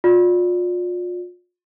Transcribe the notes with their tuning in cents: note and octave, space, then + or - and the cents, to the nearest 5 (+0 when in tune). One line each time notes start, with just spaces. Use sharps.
F4 +35 D5 +0